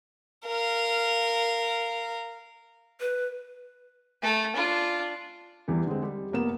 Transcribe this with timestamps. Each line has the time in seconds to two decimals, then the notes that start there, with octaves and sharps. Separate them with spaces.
0.46 A#4 F5
3.00 B4
4.22 A3 A4
4.56 D4 F4
5.68 E2 E3 G3
5.86 D3 G#3 C4
6.03 G3
6.33 F1 A#3 B3 E7